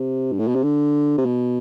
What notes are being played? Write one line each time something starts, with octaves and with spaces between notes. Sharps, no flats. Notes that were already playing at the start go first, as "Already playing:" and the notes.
Already playing: C3
G2
A2
B2
C3
D3
C3
B2